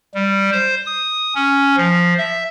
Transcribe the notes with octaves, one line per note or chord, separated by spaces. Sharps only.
G3
C5
D#6
C#4
F3
E5